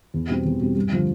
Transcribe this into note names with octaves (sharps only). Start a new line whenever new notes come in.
E2
B2 G3 C4
E2
B2 G3 C4
G2
D3 F3